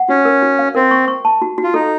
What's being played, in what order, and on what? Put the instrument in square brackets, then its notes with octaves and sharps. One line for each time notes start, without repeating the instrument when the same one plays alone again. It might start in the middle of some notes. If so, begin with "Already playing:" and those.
Already playing: [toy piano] F#5
[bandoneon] C#4 [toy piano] F#4
[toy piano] A#4
F#4
F5
[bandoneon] C4 [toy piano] A#4
[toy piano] C#6
C#6
A5
F#4
F#4
[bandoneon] F4
[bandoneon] D#4 [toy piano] A4